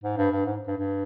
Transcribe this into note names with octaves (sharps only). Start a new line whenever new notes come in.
G#2
G2
G2
G#2
G2
G2